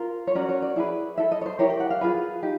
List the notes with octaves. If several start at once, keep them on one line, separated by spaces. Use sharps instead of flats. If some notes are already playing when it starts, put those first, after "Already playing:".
Already playing: F4 A#4 C5
C#5
C#4 F#4 A#4 D5
C#5
D5
E4 G#4 B4
E4 A4 E5
D#5
C#5
C5
E4 G4 A#4 C#5
G5
F#5
F5
F4 G#4 B4
D#4 G4